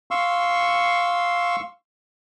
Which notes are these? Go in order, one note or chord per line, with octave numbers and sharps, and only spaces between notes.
F5 C6 C#6 E6